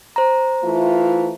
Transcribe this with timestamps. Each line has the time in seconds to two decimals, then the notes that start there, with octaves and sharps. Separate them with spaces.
0.16 C5 A#5
0.63 E3 A3 F4